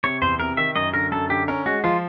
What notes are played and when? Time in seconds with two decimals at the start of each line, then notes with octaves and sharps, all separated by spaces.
0.04 C3 C#5
0.22 E2 C5
0.40 C3 A#4
0.57 D#3 E5
0.76 F#2 D#5
0.93 D3 A#4
1.11 F#2 A4
1.29 D3 G4
1.48 C#4 A#4
1.66 G#3 F#4
1.84 F3 F4